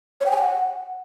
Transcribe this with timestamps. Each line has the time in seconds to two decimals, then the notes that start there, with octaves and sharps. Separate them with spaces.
0.21 C#5
0.26 G5
0.31 G#5
0.36 G5
0.41 F#5